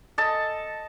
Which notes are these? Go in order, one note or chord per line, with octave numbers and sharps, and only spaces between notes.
A4 D#5 A5